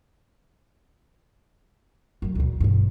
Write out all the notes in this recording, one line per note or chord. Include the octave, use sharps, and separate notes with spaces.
F#2 A2
D2 A#2
B1 G2